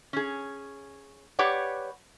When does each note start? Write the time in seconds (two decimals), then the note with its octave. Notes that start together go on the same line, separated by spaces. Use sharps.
0.13 C#4 G#4
1.39 G4 B4 C#5 D5 F#5